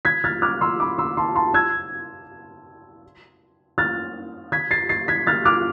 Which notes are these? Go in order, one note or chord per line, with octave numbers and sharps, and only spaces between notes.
G#6 B6
F6 A6
D6 F6
C6 E6
B5 D6
C6 E6
A5 C6
A5 C6
E6 G#6
F6 A6
G#6 B6
A6 C7
A6 C7
G#6 B6
F6 A6
D6 F6